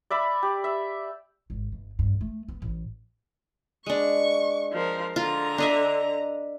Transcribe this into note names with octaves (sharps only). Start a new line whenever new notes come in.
D5 E5 B5
G4
E5
G#1
G1
G2
A3
B3
A1
G#3 D4 C#6
F3 A#4
D3 F4 A#5
D4 D#5 E5